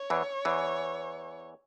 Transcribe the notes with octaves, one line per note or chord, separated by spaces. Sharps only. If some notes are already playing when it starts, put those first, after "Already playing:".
Already playing: C#5
E2 E3
E2 E3